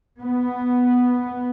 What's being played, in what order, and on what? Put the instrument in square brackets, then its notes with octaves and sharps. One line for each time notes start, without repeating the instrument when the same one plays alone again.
[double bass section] B3